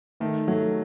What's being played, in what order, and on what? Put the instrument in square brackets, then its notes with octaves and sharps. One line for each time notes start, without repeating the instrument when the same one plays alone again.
[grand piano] D#3 [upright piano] A3 A4
[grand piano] F#3 [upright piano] A3 A4